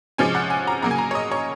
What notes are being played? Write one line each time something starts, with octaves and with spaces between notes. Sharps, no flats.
C3 F3 G#3 C#4 G#5
F#5
G#5
A#5
C#3 F#3 A#3 A#5
G#5
A#5
C#5
D#5
C#5